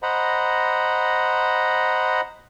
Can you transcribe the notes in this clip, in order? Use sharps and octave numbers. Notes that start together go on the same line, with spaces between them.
C5 D#5 F#5 A#5 B5